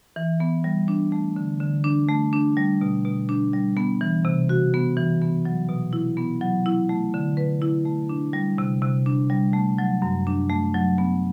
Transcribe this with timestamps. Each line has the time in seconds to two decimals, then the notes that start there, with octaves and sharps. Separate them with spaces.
0.16 E3
0.40 B3
0.64 G3
0.88 D4
1.12 A3
1.36 D3
1.60 D3
1.84 D4
2.08 A3
2.33 D4
2.57 G3
2.81 B2
3.05 B2
3.29 D4
3.53 G3
3.77 B3
4.01 E3
4.25 C3
4.49 F#4
4.74 B3
4.97 E3
5.22 B3
5.45 F#3
5.69 B2
5.93 E4
6.17 B3
6.41 F#3
6.66 E4
6.89 A3
7.14 D3
7.37 B4
7.62 E4
7.85 A3
8.09 D4
8.33 G3
8.58 C3
8.82 C3
9.06 D4
9.30 G3
9.53 A3
9.78 F#3
10.02 F#2
10.27 D4
10.50 A3
10.74 F#3
10.98 B3